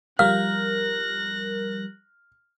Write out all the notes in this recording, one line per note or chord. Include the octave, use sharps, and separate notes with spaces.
F3 G3 A#4 F5 F6 F#6 A#6